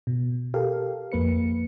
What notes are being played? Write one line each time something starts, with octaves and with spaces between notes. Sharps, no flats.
B2
G4 A4 A#4 F5
F2 A#3 B4 C#7